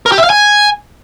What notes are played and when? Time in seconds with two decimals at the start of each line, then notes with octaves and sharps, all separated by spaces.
0.06 A#4
0.12 G4
0.18 E5
0.24 F5
0.30 G#5